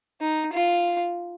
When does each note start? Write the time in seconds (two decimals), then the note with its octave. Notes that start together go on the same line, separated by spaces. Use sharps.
0.21 D#4
0.53 F4